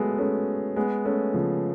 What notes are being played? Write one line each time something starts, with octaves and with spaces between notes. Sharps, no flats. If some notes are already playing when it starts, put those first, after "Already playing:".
Already playing: F#3 G#3 A3 B3
A3 C#4
G#3 B3
A3 C#4
C#3 F3